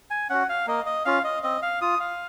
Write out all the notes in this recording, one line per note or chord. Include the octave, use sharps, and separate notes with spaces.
G#5
C#4 F#4 F#5
F5
A#3 D#5
D#5
C#4 F4 F5
D#5
C4 D#5
F5
F4 D#6
F5